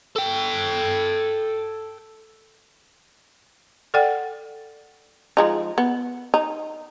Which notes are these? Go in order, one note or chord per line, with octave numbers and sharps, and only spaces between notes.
A4 G5
A4 D5 F#5 G5
F3 G#3 D#4
B3
D#4